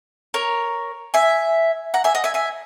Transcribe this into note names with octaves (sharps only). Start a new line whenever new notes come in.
A#4 C#5
E5 G#5
F#5 A#5
E5 G#5
D#5 F#5
E5 G#5
E5 G#5